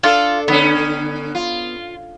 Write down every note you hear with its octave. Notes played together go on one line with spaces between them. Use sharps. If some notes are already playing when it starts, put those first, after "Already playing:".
D4 F4 A4
D3 B3 C#4
F4